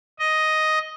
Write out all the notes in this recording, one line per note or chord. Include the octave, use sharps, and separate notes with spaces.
D#5